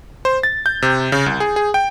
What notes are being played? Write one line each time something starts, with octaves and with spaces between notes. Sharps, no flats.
C5
A6
G6
C3
C#3
C2
G#4
G#4
G5